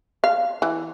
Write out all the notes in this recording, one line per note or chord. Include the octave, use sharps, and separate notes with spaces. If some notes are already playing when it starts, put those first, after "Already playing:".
F5
E3